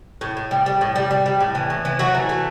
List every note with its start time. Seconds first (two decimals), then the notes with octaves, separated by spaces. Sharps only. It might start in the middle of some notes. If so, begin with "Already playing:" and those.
0.21 A2
0.37 A2
0.51 G3
0.66 G3
0.81 A2
0.96 G3
1.11 G3
1.26 G3
1.40 A2
1.55 E3
1.70 A2
1.85 E3
1.99 F#3 A3 F#4
2.15 E3
2.29 A3